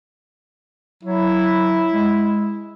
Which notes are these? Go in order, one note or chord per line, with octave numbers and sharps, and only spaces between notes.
F#3 E4
G#3